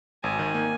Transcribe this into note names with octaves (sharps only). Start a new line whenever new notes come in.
G#1 G#5
D#3
A#3